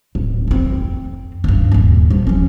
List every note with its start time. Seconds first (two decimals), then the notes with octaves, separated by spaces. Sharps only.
0.15 D1
0.47 F2 C4
1.44 D2 G2
1.72 D#2 A#2
2.10 F3 G3
2.27 F3 C#4